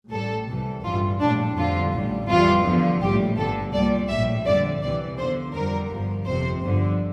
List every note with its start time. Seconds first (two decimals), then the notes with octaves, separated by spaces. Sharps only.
0.12 A1 A2 G3 A4
0.48 C2 C3 E3 G3
0.84 A1 G2 E3 G3 F4
1.20 A#1 A2 G3 D4
1.57 F2 D3 G3 F4
1.93 A1 A2 G3
2.28 F2 E3 G3 F4
2.65 E2 D3 F3
3.01 A#1 A2 G3 G4
3.37 G1 G2 D3 A4
3.73 C2 A#2 G3 D5
4.09 A#1 A2 G3 E5
4.45 F2 D3 G3 D5
4.82 C2 C3 E3 D5
5.18 E2 D3 F3 C5
5.54 F2 D3 G3 A#4
5.89 G1 G2 F3
6.26 G1 F2 C3 C5
6.62 G1 G2 D3 F3